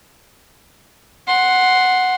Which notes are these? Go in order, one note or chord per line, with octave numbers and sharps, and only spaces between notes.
F#5 C6